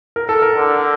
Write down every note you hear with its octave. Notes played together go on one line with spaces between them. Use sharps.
A#4
A4
A#4
D3